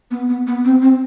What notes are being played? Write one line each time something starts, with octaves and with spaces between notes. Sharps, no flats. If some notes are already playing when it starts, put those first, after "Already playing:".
B3
B3
B3
C4
C4